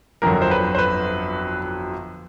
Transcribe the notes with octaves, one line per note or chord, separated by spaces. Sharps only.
G1 F2 D3 F#3 A#4
C5
B4
C5
B4